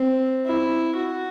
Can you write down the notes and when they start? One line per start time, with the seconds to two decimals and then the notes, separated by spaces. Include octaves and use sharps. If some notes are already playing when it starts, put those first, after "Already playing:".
Already playing: C4
0.46 E4
0.96 F#4